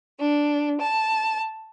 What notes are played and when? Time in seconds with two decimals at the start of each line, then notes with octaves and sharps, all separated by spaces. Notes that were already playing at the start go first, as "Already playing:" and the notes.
0.19 D4
0.80 A5